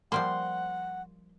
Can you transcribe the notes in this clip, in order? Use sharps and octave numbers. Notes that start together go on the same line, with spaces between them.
F3 G3 A#3 F#5 C6